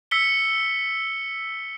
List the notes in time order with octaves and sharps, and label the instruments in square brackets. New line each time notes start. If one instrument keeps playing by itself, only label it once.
[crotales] E6 B6 C#7 G7